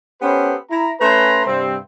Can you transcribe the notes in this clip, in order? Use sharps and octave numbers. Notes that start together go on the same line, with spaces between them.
B3 C#4 G4 A4 B4 C5
E4 A#5
A3 C#4 B4 G#5 A#5 C6
G2 C3 G3 C4